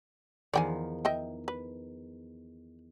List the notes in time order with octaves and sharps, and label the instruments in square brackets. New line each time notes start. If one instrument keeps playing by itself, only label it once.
[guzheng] E2 D#3 F3 [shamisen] D5 G5 G#5
[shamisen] D#5 E5 G5
B4